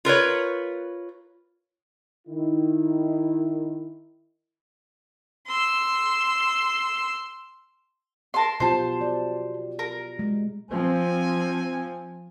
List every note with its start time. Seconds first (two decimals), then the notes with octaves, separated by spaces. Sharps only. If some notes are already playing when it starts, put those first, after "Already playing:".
0.05 F4 A#4 B4 C#5
2.28 D#3 E4
5.47 C6 E6
8.34 A#4 A5 C6
8.60 B2 F4 G4 C5 A5
9.01 D5
9.79 A#4
10.19 G#3
10.71 F3 C4 G#5